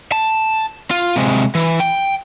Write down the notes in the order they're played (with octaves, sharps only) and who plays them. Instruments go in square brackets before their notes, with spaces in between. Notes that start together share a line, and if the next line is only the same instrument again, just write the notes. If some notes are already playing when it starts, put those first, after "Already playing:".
[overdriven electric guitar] A5
F4
C3 G#3
E3
G5